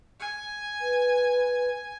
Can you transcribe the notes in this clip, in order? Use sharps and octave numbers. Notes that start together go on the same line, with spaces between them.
G#5
B4